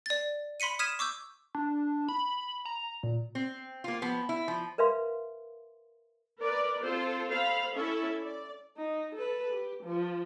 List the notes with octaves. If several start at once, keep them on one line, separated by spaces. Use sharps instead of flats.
D5 A6
B5 C6 B6 C#7 D#7
D#6 F6 G#6 B6 D#7 E7
C#6 D6 E6 G6
D4
B5
A#5
A#2
C4
A#3 F4
F3 B3
E4
F3
A#4 B4 E5 F5 C6
A#4 B4 D5
C4 F4 A4 C5
A4 C5 F5 B5
C#4 E4 A4 E5
D5
D#4
A4 B4
G4
F3